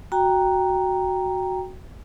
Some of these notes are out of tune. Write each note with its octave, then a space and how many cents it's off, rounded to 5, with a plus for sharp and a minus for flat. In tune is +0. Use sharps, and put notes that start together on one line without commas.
F#4 +0 G5 +5 A#5 +0